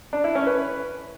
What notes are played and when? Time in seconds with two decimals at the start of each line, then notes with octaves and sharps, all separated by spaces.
0.13 D4
0.24 E4
0.35 C#4
0.47 B4